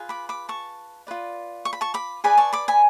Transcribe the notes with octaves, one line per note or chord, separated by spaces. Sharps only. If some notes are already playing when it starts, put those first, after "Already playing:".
Already playing: F4 G#4 B4
B5 D6
B5 D6
A5 C#6
F4 B4 D5
C#6
B5
A5 C#6
B5 D6
G#4 B4 D5 G#5 B5
A5 C#6
B5 D6
G#5 B5